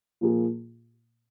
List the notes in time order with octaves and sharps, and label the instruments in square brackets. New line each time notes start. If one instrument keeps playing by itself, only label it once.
[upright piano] A#2 F3 A#3 F4 G#4